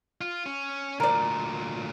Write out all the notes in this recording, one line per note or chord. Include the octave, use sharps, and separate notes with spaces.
F4
C#4
D2 A#2 A#4 D5